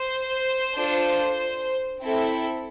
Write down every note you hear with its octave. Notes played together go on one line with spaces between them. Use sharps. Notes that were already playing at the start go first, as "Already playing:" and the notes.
Already playing: C5
D4 F4 A4
C4 E4 A4